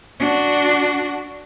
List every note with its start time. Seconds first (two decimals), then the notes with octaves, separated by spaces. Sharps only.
0.20 D4 F#4